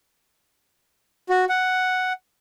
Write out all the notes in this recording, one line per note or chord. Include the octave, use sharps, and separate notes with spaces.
F#4
F#5